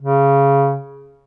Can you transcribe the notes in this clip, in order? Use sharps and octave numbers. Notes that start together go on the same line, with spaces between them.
C#3